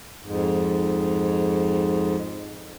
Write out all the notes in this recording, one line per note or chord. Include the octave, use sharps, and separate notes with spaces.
F2 G#2